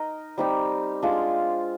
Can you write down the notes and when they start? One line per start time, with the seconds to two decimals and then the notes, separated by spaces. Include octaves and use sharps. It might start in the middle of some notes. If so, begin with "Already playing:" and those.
Already playing: D#4 A#4 D#5
0.38 G3 C4 D#4 G4
1.02 G#3 D4 F4